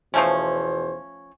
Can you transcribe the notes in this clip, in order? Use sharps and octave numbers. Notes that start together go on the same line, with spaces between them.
E2 B2 F3 A3 C#4 C5